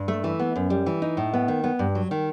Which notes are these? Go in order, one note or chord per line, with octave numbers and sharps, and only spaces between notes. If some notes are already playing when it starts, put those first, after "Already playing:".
Already playing: G2
A3
E3
B3
F#2
G3
E3
D#4
A2
B3
D#3
B3
G2
F#3
D#3